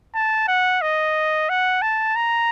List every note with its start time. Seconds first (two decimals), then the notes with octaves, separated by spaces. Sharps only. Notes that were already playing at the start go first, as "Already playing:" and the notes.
0.15 A5
0.48 F#5
0.82 D#5
1.49 F#5
1.82 A5
2.16 A#5